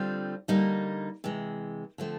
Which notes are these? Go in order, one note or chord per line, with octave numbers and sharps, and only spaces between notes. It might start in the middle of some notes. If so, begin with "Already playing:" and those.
Already playing: D3 G3 C4 F4
D3 G3 A#3 D#4
C3 E3 G#3
D3 F3 A3 C4